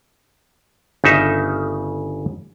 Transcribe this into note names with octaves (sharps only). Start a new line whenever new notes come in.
G1 C#3 D#4 E5